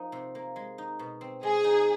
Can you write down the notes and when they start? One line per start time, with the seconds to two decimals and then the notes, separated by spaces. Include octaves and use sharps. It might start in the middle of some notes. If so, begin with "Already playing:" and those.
Already playing: F3 A#3 D#4
0.12 C3
0.35 A#3
0.56 G#3
0.78 D#4
0.99 B2
1.21 C4
1.43 G#3 G#4
1.64 D#4